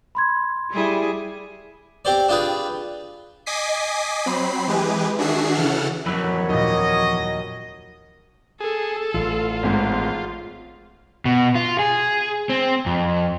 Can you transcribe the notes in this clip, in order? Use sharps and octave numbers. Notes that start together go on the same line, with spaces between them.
B5 C6 G#6
G3 E4 G#4
C4 G4 C5 D5
D4 F4 G4 G#4 B4
D#5 G#5 D6 D#6 B6 C7
F#3 C4 B5 C7
E3 G#3 G4 G#4 B4
D#3 D4 F#4 G#4 E5 C7
C#3 E3 A4 F#5 F6
F2 E3 F#3 F#4 A#4 C#5 B5 E6
D#2 A#2 D#5
G#4 A4
A1 E3 F4
G#1 G#3
B2
F4
G#4
C4
F2